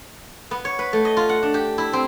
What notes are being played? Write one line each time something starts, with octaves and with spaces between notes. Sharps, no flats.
B3
C#5
B4
A3
D#5
F4
F#5
D4
G4
E4
C4